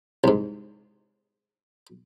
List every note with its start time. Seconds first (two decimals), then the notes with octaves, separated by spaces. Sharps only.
0.24 C2 G#2